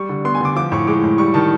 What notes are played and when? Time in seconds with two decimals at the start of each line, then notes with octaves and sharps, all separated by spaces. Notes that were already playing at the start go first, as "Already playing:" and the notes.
Already playing: G3 C#6
0.09 D3
0.25 B3 C6
0.35 G#5
0.41 D3 D6
0.55 F3 D6
0.72 A2 C#6
0.87 G#3 D6
1.04 A2
1.18 G3 C#6
1.34 D#3 A5